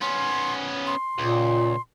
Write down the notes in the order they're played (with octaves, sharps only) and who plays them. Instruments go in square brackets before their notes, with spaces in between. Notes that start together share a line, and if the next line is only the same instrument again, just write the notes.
[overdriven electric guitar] B3 C#4 [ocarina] C6
[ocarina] C6
[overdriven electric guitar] C#2 [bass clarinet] A#2